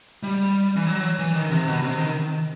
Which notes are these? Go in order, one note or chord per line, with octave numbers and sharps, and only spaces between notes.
G3
E3
F#3
E3
D#3
C3
B2
C3
D#3